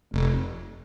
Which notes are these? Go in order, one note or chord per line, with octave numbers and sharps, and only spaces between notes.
F1